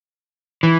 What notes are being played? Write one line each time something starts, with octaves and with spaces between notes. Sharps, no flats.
E3